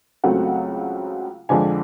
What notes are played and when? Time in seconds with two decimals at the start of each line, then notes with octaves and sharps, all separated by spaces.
0.24 C#2 C#3 F#3 A3 C4 F#5
1.49 F2 D3 F3 G#3 G#5